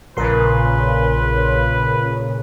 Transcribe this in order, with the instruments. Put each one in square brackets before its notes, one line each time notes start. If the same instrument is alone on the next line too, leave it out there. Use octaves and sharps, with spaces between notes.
[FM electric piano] A#1 A#4 C6 [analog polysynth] A#2 C#3 [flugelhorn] B4